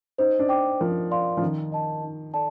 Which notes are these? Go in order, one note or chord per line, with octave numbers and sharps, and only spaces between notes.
D#4 C5
D4
G5 D6
F3 A#4
D5 F5 C6
F3
D#3 A#4
D#5 A5
D#4
A4 D5 A5